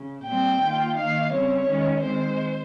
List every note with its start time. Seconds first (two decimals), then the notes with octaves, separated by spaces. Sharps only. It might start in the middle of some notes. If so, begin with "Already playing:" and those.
Already playing: C#3
0.24 A#2 G3 C4 G5
0.61 D#3 A#3 F4
0.96 D#3 A#3 D#4 F5
1.31 C#3 G3 C4 C#5
1.67 D#3 G#3 C#4
2.02 D#3 G#3 C4 C5